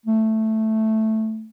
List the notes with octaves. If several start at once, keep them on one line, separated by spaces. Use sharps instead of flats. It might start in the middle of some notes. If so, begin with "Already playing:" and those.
A3